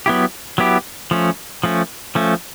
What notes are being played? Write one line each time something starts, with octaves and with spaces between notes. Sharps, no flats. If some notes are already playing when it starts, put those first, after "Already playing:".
F#3 B3 E4 G4
F#3 B3 E4 G4
F3 A3 C#4
F3 A3 C#4
F3 A3 C#4